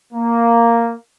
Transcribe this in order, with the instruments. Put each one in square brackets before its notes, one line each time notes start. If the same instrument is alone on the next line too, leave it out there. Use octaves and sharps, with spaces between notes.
[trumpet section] A#3